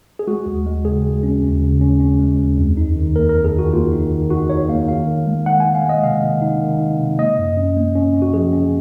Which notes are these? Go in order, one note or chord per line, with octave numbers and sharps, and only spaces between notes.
G#4
G#3 F#4
D#2
G#3
C#3 G#4
G#3
C#4
D#2
C#3
C#4
C#4
G#3
D#2
F2
D#4
D#3
A#3 A#4
A#4
F2
G#4
D#3 F#4
A#3 F4
D#4
D#3
D#4 F#4
D#4 C#5
A#3 F5
D#3 F5
D#3
G#3
D#3 F#5
G#5
D#3
F5
G#3 D#5
C3 F5
D#3
D#4
D#3
D#4
C3
A#3 D#5
F#2
C#4
A#3
C#4
C#4
F#4
F3 G#4
C#4